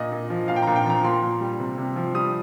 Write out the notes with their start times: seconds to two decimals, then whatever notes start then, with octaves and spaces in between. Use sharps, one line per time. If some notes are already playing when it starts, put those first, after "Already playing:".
Already playing: A#2 D#5
0.12 A#2
0.30 F3
0.48 A#2 F5
0.56 G5
0.62 A#2 A#5
0.76 G5
0.86 F3 A#5
1.03 A#2 C6
1.22 A#2
1.41 G3
1.59 C3
1.78 C3
1.96 F3
2.14 G3 D#6